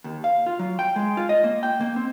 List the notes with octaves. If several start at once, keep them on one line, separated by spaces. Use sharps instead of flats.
D#2
F5
F4
F#3
G5
G#3
F4
D#5
A#3
G5
A#3
C4